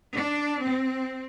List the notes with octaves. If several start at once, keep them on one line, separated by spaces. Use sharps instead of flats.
D4
C4